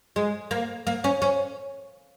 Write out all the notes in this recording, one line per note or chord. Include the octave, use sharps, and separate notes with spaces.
G#3
A#3
A#3
C#4
C#4